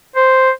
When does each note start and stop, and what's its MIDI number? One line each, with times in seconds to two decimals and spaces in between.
0.15 0.50 72